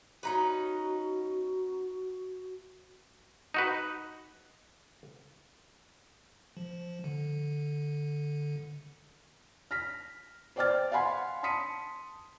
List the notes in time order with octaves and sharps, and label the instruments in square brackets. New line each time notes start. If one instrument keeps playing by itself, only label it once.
[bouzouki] C#4 D#4 B4 [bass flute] F#4
[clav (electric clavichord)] D#4 F#4 B4
[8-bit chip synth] F3
D3
[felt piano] F6 A#6 B6
C5 D5 G5 D6 F6 A6
F5 F#5 G#5 B5 C6
A5 C6 D#6 B6 C#7 D#7